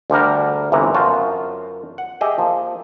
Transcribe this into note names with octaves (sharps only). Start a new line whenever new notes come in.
D2 D3 G3 A#4
G1 C3 E3 A#5
F#2 F4 F#4 C5 A5
F#5
G4 G#4 D#5 E5
F3 A#3